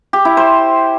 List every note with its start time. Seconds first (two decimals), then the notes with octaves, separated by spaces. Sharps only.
0.13 G4
0.25 E4
0.37 C5